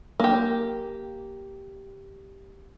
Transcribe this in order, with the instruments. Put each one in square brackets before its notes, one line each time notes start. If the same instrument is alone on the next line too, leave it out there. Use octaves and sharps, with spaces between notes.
[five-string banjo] A#3 G4